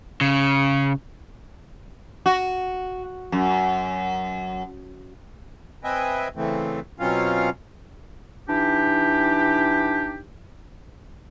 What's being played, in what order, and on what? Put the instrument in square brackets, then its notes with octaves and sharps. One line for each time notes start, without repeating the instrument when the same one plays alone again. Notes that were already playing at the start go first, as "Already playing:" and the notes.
[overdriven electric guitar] C#3
[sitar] F#4
F#2
[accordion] C4 B4 D#5 E5 G5 G#5
C#3 E3 A3 C4
B2 F#3 C4 C#4 F4 F5
[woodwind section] E3 D4 D#4 G4